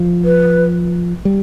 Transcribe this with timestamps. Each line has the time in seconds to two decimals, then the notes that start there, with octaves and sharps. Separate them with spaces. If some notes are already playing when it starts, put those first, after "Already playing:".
Already playing: F3
0.25 B4
1.25 G3